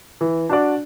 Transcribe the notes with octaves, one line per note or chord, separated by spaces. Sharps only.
E3
D4 F#4 D5